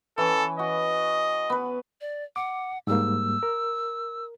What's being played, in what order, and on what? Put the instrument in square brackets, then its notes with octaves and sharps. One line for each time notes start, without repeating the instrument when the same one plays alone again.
[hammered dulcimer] E3 C#4 [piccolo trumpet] A4
[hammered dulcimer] F#4 [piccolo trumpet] D#5
[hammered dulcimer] B3 B4
[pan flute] D5
[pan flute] F#5 [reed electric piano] D6
[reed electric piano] G#2 G3 A#3 [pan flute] E6
[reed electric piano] A#4